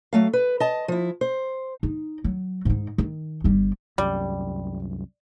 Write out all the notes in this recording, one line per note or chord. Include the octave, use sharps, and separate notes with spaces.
F#3 A3 F5
B4
D#5 A5
F3 E4
C5
D#4
F#3
G#2 D#4
D#3
G1 G3
C2 F#2 G3